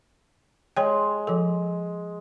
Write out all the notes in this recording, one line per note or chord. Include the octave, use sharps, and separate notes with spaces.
G#3 C#5 G5
F3 A4